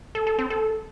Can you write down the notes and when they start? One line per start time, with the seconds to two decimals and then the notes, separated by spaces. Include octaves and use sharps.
0.15 A4
0.27 A4
0.39 C4
0.50 A4